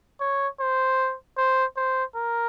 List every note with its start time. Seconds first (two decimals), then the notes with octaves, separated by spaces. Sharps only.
0.20 C#5
0.60 C5
1.37 C5
1.77 C5
2.16 A#4